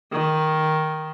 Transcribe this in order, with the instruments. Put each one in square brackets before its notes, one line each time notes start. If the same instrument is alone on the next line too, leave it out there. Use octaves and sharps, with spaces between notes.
[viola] D#3